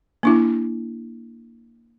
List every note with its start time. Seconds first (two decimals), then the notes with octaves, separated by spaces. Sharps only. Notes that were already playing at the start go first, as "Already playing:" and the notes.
0.23 A#3 D4 E4